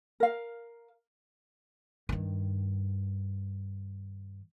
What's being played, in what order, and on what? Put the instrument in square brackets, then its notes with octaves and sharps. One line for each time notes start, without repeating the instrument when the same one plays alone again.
[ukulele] A#4 F5
[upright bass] G2 D#3